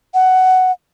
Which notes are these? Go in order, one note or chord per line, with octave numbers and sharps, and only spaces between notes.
F#5